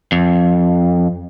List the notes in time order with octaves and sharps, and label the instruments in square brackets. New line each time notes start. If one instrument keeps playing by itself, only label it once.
[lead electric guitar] F2